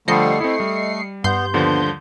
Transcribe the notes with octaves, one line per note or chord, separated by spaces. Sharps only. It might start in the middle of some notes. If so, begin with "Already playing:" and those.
D3 F3 G3 A3 D#5 C7 C#7
A3 C4 E4
G3
G2 B3 C6 G6
D#2 D3 F3 B3